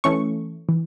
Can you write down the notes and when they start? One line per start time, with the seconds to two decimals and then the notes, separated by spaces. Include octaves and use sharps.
0.04 E3 A3 C#4 C#6
0.69 E3